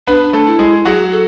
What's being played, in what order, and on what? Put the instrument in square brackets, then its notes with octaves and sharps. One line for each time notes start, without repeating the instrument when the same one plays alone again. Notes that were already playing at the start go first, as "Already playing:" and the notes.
[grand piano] B3 B4 [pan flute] D4
[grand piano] A3 A4
[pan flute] E4
[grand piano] G#3 G#4
[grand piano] F#3 F#4 [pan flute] G#4
[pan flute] A4